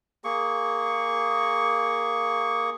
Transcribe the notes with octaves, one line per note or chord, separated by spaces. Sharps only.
A#3 G#4 C#6